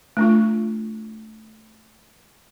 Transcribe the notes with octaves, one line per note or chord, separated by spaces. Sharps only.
A3 D4 F4